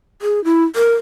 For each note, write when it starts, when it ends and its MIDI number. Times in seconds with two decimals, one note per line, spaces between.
0.22 0.43 68
0.44 0.64 64
0.76 0.94 70